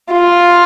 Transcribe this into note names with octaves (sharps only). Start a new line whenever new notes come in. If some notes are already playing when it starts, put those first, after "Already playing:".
F4